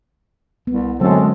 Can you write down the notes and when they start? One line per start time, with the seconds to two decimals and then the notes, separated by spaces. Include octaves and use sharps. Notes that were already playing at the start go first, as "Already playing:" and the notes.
0.67 C2 B3
1.01 F#2 D3 F#3 G#3 A3 C4 A4